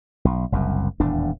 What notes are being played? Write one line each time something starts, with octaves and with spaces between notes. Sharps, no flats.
B1
F#1 C2 F#2
D#1 E2 A2 D4